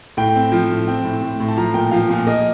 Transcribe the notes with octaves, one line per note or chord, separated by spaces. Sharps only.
A2 G5
C4
F3
A2
C4
A2
A2
A2
A5
F3 A#5
A#2 G5
F3 F5
A#2
A#3 D#5